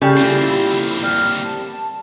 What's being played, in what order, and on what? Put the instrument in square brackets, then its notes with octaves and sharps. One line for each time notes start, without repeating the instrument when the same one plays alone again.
[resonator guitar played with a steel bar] C#3 [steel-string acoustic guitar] G3 G4 A4
[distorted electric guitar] A#3 C4 [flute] E4 [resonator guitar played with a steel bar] F4
[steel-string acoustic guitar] G3 [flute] F6
[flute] A5